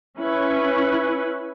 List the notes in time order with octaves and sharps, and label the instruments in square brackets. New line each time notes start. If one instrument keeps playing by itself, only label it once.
[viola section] C#4 E4 B4